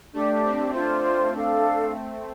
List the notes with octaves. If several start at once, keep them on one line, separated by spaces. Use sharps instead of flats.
A3 D4 G4 D5
C4
A3 D4 F4 C5
C4
D4 A4 F5